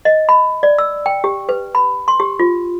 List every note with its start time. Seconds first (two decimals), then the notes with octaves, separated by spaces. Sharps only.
0.05 D#5
0.29 B5
0.63 D5
0.78 E6
1.06 G5
1.24 G4
1.49 B4
1.75 B5
2.08 C6
2.20 G4
2.39 F4